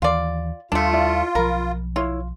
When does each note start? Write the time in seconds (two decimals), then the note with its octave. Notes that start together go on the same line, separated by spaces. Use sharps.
0.02 D#2 E3 F4 D5 F5
0.72 D#2 G3 A3 D4 F4
0.93 E4 D5 E5
1.35 B1 F3 A#4 B5
1.96 E4 F4 C#5